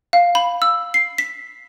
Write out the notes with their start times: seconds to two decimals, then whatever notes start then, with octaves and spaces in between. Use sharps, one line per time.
0.13 F5
0.35 B5
0.62 E6
0.94 C7
1.18 B6